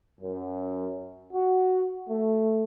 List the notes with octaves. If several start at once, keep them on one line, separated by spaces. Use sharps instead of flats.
F#2
F#4
A3